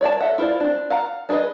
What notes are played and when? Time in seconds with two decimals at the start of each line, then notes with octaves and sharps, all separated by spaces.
0.01 C#5 D5 G5 A5
0.21 A4 E5 F#5
0.38 E4 F4 C5 D5
0.60 C4 D4
0.90 F5 F#5 A#5
1.29 D4 G#4 A4 B4 D#5